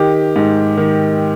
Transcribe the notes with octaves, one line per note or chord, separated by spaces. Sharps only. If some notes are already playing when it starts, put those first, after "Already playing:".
Already playing: D#3 G4
G#2
D#3